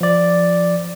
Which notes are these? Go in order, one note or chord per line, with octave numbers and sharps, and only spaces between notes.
F3 D5